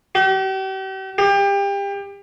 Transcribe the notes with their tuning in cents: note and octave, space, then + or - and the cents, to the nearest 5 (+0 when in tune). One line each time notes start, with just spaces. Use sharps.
G4 -40
G4 +30